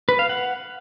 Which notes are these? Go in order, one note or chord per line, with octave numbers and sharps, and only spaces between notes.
B4
F5
F#5